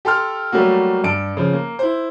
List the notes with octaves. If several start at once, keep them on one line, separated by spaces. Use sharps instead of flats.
G4 A4 C6 F6
F#3 G3 A3 A#3 F#4
G2 A5 D7
C#3 F3
A#3
E4 C5